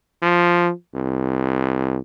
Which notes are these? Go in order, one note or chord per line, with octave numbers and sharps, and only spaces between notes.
F3
C2